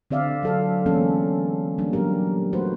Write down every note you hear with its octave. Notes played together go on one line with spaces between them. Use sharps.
D3 C4 D5 E5 F5
F#3 A4 F5
E3 G#3 A#3 B3 C#4 A4
G3 A#3 D4
A#2 F#3 B3 G4 A#4
A3 F#4 B4 C5